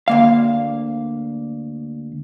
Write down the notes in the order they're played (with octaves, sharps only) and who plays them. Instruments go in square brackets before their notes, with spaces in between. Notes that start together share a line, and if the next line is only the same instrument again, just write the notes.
[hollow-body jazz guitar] D2 A#3 F5